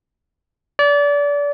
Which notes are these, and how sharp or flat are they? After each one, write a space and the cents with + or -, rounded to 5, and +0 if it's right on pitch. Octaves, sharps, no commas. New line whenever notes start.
D5 -30